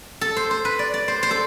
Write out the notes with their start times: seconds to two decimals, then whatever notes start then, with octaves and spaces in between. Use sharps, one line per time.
0.21 A4
0.36 C5
0.51 C5
0.65 B4
0.79 D5
0.94 D5
1.08 C5
1.23 C5
1.31 A4